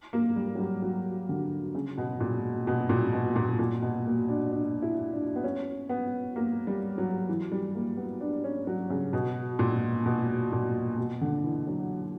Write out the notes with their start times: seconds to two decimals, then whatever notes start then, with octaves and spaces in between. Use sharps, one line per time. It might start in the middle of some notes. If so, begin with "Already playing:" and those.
0.13 A#3
0.36 G3
0.55 F#3
0.59 G3
0.82 F#3
1.29 D3
1.75 C#3
1.98 B2
2.20 A#2
2.67 B2
2.89 A#2
3.13 B2
3.36 A#2
3.59 A#2
3.82 B2
4.06 A#3
4.29 D4
4.52 D4
4.82 E4
5.13 D4
5.36 B3
5.44 C#4
5.89 B3
6.36 A#3
6.67 G3
6.98 F#3
7.29 E3
7.52 G3
7.75 A#3
7.97 B3
8.21 D4
8.44 C#4
8.67 F#3
8.90 C#3
9.13 B2
9.59 A#2
10.06 B2
10.52 A#2
10.98 B2
11.21 D3
11.44 E3
11.67 F#3